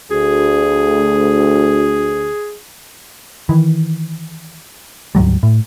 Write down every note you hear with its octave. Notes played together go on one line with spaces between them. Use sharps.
D2 G#4
D#3 E3
D2 G#2 F#3 G3
A2